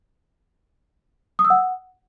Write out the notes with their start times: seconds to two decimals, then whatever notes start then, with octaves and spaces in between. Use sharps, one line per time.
1.39 D#6
1.45 E6
1.50 F#5